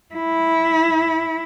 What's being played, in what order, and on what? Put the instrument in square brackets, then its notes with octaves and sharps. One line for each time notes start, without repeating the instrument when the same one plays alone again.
[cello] E4